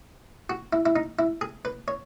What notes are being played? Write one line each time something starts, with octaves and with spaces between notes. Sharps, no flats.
F#4
E4
E4
D#4
E4
G#4
B4
C#5